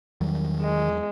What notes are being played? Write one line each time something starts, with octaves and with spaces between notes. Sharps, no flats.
E2 D#3 F#3 G3
G#3